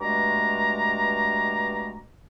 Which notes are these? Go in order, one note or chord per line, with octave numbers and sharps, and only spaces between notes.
G2 B2 G#3 A3 A#5 D6